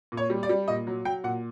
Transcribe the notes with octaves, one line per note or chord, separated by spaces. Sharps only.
A#2
C#5
G3
D5
G3
A#2 D#5
F#3
F#3 G5
A#2 F#5